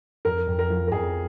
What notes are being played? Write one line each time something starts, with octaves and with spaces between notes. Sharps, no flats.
F2 A#4
F2
A#4
F3
A#4
F2 G#4